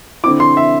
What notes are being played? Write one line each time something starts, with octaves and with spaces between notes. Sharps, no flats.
D3 C4 E4 D6
C6
E5